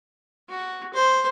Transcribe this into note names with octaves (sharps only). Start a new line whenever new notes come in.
F#4
C5